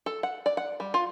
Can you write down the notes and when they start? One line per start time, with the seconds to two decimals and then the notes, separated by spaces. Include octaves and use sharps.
0.06 A4
0.23 F#5
0.46 D5
0.57 F#5
0.80 G3
0.94 F4